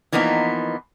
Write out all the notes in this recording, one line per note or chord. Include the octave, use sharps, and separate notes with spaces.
E3 F3 A#3 B3 D#4